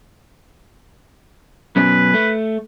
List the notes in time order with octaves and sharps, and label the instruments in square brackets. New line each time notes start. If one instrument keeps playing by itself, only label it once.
[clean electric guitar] F#2 B2 C#4 [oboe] B4
[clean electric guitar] A3